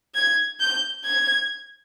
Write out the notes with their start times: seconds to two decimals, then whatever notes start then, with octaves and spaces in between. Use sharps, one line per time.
0.15 G#6
0.60 G6
1.05 G#6